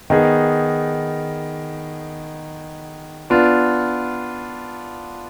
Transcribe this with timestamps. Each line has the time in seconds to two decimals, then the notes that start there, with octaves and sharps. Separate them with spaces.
0.10 D#3 B3 D#4 G#4
3.30 B3 D4 F4